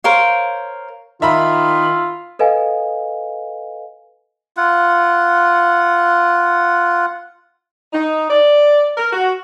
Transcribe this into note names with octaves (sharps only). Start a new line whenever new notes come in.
A#4 C5 C#5 F5
D#3 F4 E5 A#5 B5
A4 B4 D#5 F5 G#5
F4 F#5
D#4
D5
A#4
F#4